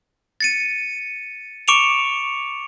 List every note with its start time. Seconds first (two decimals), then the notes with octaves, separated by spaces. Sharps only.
0.41 A6 C#7 D#7
1.68 C#6 D6 C#7 D7 E7 F7